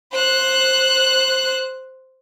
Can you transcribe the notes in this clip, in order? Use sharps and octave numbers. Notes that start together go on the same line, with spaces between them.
C5 F#6